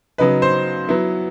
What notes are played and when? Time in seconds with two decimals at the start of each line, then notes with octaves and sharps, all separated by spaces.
0.18 C#3 F#3 B3 D#4 B4
0.42 C5
0.89 F#3 B3 E4